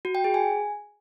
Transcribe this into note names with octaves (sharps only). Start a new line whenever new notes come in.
F#4
G5
G#4
G#5